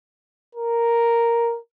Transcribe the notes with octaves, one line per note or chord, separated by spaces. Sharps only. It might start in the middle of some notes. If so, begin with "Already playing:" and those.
A#4